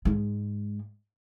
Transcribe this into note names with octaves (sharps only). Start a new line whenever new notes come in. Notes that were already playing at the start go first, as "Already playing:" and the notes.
G#2 G#3